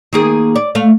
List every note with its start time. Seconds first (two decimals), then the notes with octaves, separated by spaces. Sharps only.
0.13 D#3 A#3 G#4
0.55 D5
0.75 A3 F5